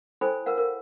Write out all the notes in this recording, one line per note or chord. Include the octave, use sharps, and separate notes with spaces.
E4 A4 C5 G5 G#5 B5
A#4 B4 F5 F#5
A#4